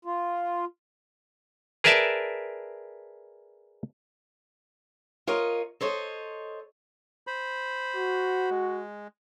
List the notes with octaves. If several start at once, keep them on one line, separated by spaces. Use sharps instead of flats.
F4
G#4 A#4 B4 D5 E5 A5
F4 A#4 C#5 D#5
A4 C5 C#5 D#5
C5 B5
F#4
G#3